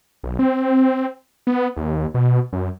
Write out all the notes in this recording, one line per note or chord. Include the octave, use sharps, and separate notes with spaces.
B1
C4
B3
D#2
B2
F#2